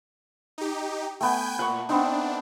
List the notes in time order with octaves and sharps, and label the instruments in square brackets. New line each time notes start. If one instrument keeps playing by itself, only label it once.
[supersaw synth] D#4 G4
[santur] A3 B3 [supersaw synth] G5 G#5 G6
[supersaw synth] A#2 [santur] F#5 C#6
[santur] B3 C4 D#4 [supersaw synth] D4